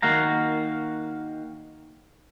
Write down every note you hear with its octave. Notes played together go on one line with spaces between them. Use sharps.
D#3 A#3 F#4 F5 A#5